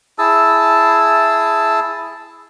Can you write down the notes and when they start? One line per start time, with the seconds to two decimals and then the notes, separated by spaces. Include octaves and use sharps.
0.18 E4 G#4 A5 E6